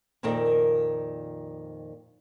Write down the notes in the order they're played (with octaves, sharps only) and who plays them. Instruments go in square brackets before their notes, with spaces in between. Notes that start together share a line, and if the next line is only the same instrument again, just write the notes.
[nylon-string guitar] F2 A#2 D#3 C4 A#4